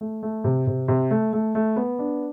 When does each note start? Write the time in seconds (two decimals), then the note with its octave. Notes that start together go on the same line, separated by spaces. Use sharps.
0.01 A3
0.23 A3
0.44 C3
0.67 C3
0.88 C3
1.11 A3
1.33 A3
1.55 A3
1.76 B3
1.99 D4